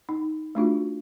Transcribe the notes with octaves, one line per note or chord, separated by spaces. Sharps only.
D#4
A3 D4 F4 F#4